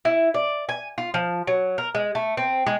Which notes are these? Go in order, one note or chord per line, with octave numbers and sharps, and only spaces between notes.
E4
D5
G#5
F4
F3
F#3
A#4
G#3
A3
C4
G#3